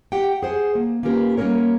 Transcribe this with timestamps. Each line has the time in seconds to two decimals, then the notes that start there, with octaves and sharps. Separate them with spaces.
0.12 G4 F#5 G5
0.43 G#4 C5 F#5 G#5
0.75 A#3
1.03 A#3 C#4 F4 G4 A#4 B4
1.37 G3 A#3 C4 C#4 A#4 C#5